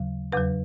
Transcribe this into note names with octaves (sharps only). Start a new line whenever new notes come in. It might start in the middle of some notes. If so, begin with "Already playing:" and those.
Already playing: D#2 C#3 F#3
E2 C#3 F#3 B4